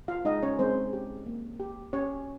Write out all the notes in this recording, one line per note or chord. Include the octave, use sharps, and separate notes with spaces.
F4 F5
G#3 D#4 D#5
C#4 C#5
G#3 C4 C5
G4
A#3
G4
C#4 G4 C#5